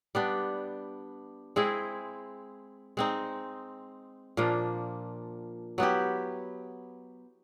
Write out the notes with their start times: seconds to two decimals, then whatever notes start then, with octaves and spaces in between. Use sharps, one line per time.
0.15 G3 B3 D4
1.56 G#3 C4 E4 G#4
2.97 G#3 C4 D#4
4.37 A#2 F3 A#3 D4
5.78 F#3 B3 E4 G4